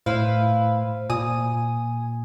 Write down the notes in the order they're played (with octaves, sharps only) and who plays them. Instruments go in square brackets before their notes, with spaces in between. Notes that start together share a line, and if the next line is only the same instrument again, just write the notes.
[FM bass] A2 [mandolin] E4 B4 F5 [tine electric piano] C5
[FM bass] A#2 [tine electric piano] G#5 [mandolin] D#6